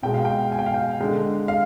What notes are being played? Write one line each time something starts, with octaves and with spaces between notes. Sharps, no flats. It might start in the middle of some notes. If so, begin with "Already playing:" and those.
B2 G#3 G5
F5
G5
G#5
G5
F5
G5
D3 G#3
F5